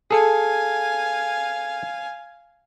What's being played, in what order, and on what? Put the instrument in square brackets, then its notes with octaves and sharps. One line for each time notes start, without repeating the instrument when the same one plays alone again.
[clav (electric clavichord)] G#4 A4 [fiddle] F5 G#5